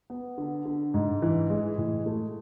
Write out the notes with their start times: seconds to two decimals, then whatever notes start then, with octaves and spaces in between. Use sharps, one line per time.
0.10 B3
0.38 D3
0.65 D3
0.94 G#2
1.22 E3
1.50 G#3
1.78 A2
2.06 A3